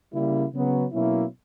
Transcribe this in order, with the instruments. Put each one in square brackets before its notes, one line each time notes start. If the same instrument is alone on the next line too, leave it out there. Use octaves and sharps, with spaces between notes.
[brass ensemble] C#3 G3 A#3 E4
C#3 F#3 B3
B2 F#3 A#3 C#4 E4